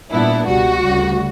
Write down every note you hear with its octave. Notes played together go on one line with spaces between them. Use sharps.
A#2 G3 B3 D4 E4
C#2 B2 G3 F#4
D2 C#3 G3